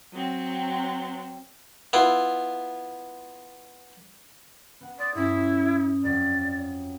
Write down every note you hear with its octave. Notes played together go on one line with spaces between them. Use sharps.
F#3 C4
B3 E4 F4
B3 F#5
D5 C6 D#6
G2 C#4 E4
F2 F#3 D5